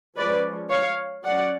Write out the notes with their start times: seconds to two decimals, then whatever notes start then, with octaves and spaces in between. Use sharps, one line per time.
0.15 F3 G#3 C#4 B4 D5
0.70 C#5 F5
1.23 F#3 C#4 D5 F#5